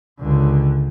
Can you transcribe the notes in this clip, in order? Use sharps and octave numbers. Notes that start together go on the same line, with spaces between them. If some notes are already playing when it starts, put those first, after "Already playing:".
C#2 D3